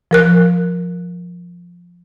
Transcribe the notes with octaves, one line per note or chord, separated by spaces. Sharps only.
F3 A#4 F#6